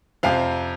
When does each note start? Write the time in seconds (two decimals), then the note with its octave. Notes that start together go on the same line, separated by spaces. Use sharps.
0.23 F2 C3 F3 F5